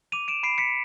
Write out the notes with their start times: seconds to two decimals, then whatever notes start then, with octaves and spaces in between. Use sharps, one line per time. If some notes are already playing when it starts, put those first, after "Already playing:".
0.12 D6 D#7 F7
0.28 D7 E7
0.43 B5 C7 D7
0.58 B6 C#7